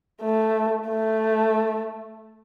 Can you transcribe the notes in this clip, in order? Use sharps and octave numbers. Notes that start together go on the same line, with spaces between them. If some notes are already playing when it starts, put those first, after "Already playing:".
A3
A3